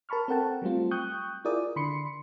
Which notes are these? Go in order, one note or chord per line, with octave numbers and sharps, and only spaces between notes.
A#4 A5 B5 C#6 F6
C4 A4 A#4 F#5 G5 A5
F#3 G3 A3 C4 F4
G5 C#6 D#6 F#6 G6
E4 F4 G#4 A#4 D5 D#6
D3 B5 C6 C#7